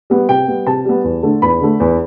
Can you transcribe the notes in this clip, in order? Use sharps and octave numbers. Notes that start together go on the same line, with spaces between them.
G3 B3
C3 G5
G3 B3
C3 A5
G3 B3
E2
D3 A3
E2 B5
D3 A3
E2